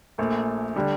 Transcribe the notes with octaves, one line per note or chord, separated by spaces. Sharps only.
A#1 A#2 A3
D3 G3 D4